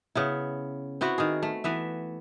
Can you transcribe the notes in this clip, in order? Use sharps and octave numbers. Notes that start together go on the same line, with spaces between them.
C#3 B3 E4
B3 C4 E4 F#4
D#3 G#4
A3
E3 B3 E5